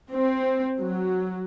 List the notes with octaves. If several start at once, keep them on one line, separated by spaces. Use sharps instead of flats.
C4
F#3